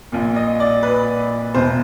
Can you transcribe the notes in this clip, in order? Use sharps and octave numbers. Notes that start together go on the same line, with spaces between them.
A#1 A#2
D#5
D5
B4
E1 E2 B2 C5